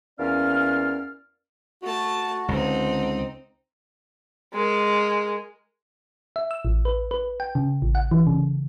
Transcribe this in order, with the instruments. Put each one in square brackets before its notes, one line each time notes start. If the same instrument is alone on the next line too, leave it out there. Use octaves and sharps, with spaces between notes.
[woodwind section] E2 A#3 C#4 D5 F5 F6
[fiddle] A3 A5 [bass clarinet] F#4
[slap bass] C#2 [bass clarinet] D3 [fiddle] C4 D#4
[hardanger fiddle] G#3 A#4
[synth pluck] E5
E6
A1
B4
B4
G5
C#3
A1
F#5
E3
C#3